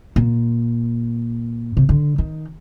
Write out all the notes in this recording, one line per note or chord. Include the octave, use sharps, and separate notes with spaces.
A#2
C3
D3
D#3